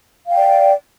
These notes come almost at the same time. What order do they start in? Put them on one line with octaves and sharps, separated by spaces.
F5 G5 D5